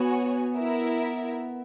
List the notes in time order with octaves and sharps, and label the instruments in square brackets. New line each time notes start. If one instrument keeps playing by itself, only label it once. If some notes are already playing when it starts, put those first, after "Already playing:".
Already playing: [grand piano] B3 [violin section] F#4 C#5 G#5
[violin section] E4 A#4 E5